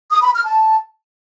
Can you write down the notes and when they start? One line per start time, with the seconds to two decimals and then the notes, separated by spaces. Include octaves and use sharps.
0.11 D#6
0.23 B5
0.34 F6
0.46 A5